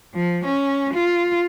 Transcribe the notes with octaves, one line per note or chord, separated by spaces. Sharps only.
F3
C#4
F4